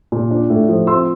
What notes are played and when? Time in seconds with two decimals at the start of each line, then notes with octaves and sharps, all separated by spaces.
0.12 A#2
0.31 D4
0.50 A2
0.69 F3
0.87 C4 C6 E6